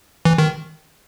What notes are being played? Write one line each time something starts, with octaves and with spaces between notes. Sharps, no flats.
E3
D#3